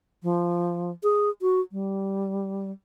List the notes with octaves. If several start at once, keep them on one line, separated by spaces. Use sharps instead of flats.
F3
G#4
F#4
G3